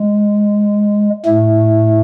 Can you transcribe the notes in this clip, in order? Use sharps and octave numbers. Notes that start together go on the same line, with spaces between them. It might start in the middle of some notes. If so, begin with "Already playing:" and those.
Already playing: G#3
A2 A3